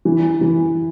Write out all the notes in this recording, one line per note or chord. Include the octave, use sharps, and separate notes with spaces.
E3
E3